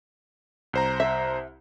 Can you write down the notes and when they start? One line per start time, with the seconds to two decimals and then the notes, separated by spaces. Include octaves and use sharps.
0.73 C2 C5 A#5
1.00 E5